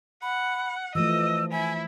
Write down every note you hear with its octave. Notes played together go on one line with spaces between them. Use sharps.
F#5 B5
E3 F3 A3 D#5 E6
E4 G#5